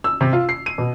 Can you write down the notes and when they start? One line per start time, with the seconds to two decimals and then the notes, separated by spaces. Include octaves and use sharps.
0.04 E6
0.21 C3
0.33 F4
0.49 C7
0.66 D#7
0.78 B2